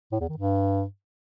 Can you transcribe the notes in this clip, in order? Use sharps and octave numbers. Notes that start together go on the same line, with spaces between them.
A2
E2
D#3
G2